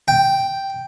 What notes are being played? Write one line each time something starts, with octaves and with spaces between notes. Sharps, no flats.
G5